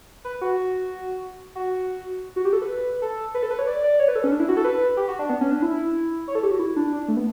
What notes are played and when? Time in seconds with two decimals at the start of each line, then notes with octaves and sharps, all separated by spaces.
0.25 B4
0.42 F#4
1.55 F#4
2.36 F#4
2.45 G4
2.53 A4
2.62 B4
3.02 A4
3.35 B4
3.43 A4
3.51 B4
3.59 C#5
3.67 D5
3.83 D5
3.99 C#5
4.08 B4
4.16 A4
4.24 C#4
4.32 D4
4.40 E4
4.49 F#4
4.57 A4
4.64 B4
4.97 G4
5.08 F#4
5.19 D4
5.29 B3
5.41 C#4
5.51 D4
5.62 E4
6.28 C#5
6.35 A4
6.43 G4
6.51 F#4
6.59 E4
6.76 D4
6.93 D4
7.08 A3
7.17 B3